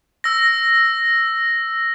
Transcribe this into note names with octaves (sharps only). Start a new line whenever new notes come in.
E6 A#6